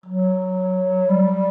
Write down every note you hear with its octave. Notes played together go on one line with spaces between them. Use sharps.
F#3
G3